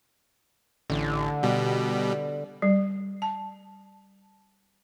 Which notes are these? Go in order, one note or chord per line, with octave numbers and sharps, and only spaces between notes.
A1 D3
B2 G3
G3
A5